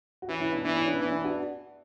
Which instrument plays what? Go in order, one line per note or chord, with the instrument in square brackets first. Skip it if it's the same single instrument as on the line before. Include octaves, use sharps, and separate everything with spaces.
[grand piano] F#4
[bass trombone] E3 [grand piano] C#4 E4
[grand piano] C#4 E4
B3 D4
[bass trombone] E3 [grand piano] B3 D4
[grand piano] C#4 E4
B3 D4
[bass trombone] E3 [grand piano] B3
[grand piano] B3 D4
D4 F#4